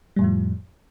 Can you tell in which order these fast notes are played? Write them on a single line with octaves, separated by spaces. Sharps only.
G3 A2 F2 F3